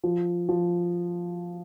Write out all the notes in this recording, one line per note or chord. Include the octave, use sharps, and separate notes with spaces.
F3
F3